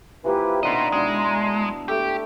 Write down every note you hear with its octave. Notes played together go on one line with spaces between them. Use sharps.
E3 F3 A#3 E4 G4 B4
D3 D#3 B3 C4 D#5 A#5 C6
B2 G#3 D4 E4
A5
A3 G4 A4